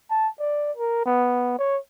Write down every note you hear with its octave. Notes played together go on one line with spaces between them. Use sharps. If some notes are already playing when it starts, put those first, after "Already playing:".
A5
D5
A#4
B3
C#5